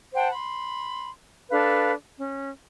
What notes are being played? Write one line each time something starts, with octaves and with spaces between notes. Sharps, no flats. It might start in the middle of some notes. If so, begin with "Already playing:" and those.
C5 F#5 G5 A5
B5 C6
D4 A4 B4 F5
C#4